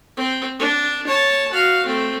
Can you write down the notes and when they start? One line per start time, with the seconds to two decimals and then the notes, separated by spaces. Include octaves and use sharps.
0.17 C4
0.59 D4
1.07 C#5 A5
1.51 F#4 F5
1.86 A3 C4